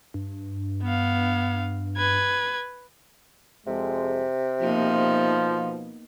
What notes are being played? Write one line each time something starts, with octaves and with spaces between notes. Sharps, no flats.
G2
B3 F5
B4 G#6
F2 C3 G#3
B2 F3 A#3 B3 D#4